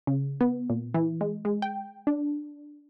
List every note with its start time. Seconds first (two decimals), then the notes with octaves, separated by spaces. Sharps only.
0.07 C#3
0.41 B3
0.70 A#2
0.94 E3
1.21 G#3
1.45 G#3
1.62 G5
2.07 D4